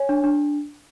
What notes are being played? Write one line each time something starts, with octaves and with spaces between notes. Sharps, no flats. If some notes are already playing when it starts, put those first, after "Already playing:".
Already playing: C#5 G#5
D4
D4